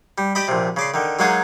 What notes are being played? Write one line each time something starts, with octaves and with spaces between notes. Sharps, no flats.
G3
G4 D5 D#5 B5
A#1 C3
C#3 D5 C6
D3 D#3
F#3 G#3 A#3 D#4 F#4 G#4